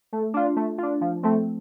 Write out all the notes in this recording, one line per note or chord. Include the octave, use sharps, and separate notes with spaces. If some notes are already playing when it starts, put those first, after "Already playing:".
A3
D4 F4
A3
D4 F4
F3
A3 C4